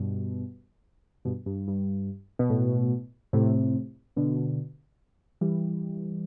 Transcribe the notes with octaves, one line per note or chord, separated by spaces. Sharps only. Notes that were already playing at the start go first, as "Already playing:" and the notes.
Already playing: G2 B2
G2 B2
G2
G2
B2
A2
A2 C3
B2 D3
E3 G3